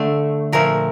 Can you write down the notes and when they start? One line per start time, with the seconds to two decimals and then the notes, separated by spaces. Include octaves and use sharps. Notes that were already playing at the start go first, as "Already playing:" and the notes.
Already playing: D3 A3
0.52 A#2 F3 A3 A#4